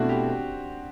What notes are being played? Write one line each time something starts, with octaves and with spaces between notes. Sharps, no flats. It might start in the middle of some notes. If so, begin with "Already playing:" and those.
Already playing: B2 A3 C4 D4 E4 F#4
G4